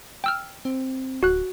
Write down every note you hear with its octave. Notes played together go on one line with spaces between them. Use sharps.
G5 E6 F6
C4
D1 F#4 F#6